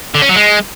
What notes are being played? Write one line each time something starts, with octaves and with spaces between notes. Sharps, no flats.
D3
C#4
F#3
G#3